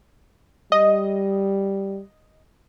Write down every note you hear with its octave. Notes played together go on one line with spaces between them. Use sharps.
G3 D#5